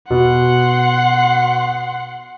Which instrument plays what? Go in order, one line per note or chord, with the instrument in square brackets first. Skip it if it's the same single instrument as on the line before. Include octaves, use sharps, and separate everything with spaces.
[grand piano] B2 [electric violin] F#5 C6